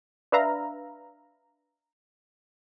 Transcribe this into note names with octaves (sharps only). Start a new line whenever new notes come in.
D4 B4 E5 F5 A#5